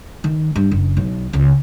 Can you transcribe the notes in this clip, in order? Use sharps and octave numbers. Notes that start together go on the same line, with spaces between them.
D#3
G2
F#1
B1
C#2